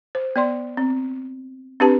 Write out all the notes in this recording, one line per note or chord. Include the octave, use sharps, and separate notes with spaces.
C5
B3 D5 C6
C4
C4 D4 G4 B4 A5